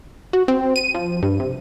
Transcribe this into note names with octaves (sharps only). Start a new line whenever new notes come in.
F#4
C4
D#7
F3
G2
C3